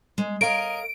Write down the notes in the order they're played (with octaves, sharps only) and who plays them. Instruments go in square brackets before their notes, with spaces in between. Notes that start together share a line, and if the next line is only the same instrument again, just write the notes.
[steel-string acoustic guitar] G#3
[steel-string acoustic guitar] A#4 D#5 [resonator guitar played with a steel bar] C#5 F5 [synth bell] D7